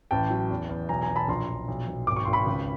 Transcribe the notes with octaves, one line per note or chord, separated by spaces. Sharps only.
A1 G5 A5
F#3
E2
E2
B1 G#5 A#5
G#5 A#5
B1
A5 B5
A#1 A#5 C6
A#1
B1
B1
G#1 D6
C#6
G#1 C6
B5 C#6
C#2